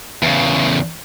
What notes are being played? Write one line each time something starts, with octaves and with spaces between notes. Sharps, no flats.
E2 C#3